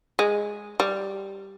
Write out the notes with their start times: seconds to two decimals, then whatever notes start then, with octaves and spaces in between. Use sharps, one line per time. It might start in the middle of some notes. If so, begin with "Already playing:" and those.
0.19 G#3
0.80 G3